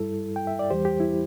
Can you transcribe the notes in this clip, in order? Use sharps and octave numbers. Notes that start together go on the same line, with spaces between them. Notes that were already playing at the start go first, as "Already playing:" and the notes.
Already playing: G2 G3 E4 A4
G5
E5
D5
E2 E3 G3 G4 C5
G4
E4